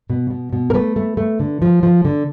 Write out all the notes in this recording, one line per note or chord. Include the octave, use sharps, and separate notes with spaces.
B2
B2
B2
A#4
A3 B4
A3
A3
D3
F3
F3
D3